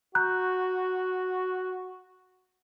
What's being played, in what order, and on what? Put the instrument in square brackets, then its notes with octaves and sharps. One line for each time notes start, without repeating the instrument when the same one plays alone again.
[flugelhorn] F#4 [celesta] A#5 F#6 G6